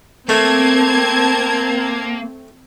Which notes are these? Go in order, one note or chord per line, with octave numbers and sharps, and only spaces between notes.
A3 A#3 C4 A5 G#6